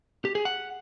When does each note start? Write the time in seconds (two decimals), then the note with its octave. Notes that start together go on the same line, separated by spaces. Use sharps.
0.25 G4
0.35 G#4
0.45 F#5